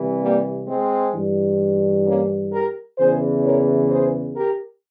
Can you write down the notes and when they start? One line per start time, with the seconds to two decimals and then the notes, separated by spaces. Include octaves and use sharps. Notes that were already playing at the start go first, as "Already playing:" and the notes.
Already playing: C2 C3 E3
0.22 G3 A#3
0.68 G#3 C4
1.14 G2 E3
2.06 A#3 C#4
2.52 G4 A#4
2.98 E2 C#3 E3 G#4 C5
3.44 A#4 C#5
3.90 G#4 C5
4.36 G4 A#4